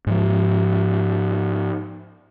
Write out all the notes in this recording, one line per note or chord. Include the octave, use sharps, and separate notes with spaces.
G#2 F3